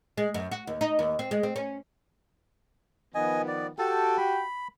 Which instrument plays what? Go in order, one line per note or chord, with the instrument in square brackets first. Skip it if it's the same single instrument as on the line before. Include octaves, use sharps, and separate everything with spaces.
[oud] G#3
F#2
F#4
D#2
D#4
D#2
C4
G#3
C4
C#4
[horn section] D#3 F3 B3 [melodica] D#5 G#5
[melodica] D5
[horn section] F#4 G4 G5 [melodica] A4 A5
[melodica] B5